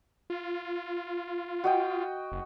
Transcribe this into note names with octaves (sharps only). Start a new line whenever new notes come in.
F4
F#4 D#5 G5
F#1